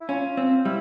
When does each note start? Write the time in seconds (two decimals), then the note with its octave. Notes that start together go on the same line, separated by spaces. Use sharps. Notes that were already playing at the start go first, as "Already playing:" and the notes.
0.01 E4
0.09 C#4 F4
0.37 C4
0.65 G3 E4